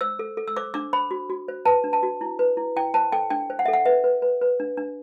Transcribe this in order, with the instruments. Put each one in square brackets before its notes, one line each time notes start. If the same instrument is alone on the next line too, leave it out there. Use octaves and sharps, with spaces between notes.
[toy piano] C5 E6
A4
A4
E6
C5 D6
D4 D6
C5 B5
F#4
F#4
C5
B4 A5
D4
A5
F#4
E4
B4
E4
E4 G5
C5 A5
A4 G5
D4 G5
C5
F#5
E5
A4
F#5
B4 E5
B4
B4
B4
D4
D4